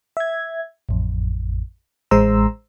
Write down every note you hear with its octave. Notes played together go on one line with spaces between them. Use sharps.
E5 G#6
A1 F2
A1 G#3 C5 A#5 C6 E6